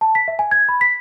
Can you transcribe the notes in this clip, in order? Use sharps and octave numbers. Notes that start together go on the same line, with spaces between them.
A5
B6
E5
G#5
G#6
B5
B6